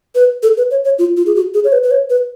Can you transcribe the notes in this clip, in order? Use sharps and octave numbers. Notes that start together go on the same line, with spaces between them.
B4
A4
B4
C#5
C#5
F4
F4
G#4
F#4
G#4
C#5
B4
B4
C#5
B4